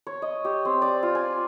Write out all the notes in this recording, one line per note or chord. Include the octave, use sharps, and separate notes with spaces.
C#5
D#5
G4
C4
D5
F4
G#5